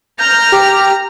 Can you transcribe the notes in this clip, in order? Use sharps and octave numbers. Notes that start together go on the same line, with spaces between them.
A#5 F6 G6
G4